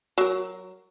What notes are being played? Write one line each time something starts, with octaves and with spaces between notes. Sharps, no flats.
F#3 A#4